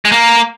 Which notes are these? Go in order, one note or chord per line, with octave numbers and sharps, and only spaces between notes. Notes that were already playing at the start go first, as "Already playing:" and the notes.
G#3
A#3